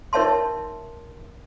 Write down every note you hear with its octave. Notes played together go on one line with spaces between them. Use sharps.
D#4 A#4 C#5 E5 A5 C6